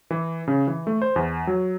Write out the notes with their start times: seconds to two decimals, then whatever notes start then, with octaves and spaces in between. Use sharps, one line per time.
0.11 E3
0.48 C#3
0.67 E3
0.87 A3
1.02 C5
1.16 E2
1.47 F#3